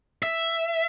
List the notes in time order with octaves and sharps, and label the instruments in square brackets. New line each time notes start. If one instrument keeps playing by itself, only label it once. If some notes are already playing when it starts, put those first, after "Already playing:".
[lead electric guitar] E5